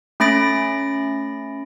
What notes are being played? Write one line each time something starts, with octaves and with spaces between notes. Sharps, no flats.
A3 C#4 B5 A6 A#6 D7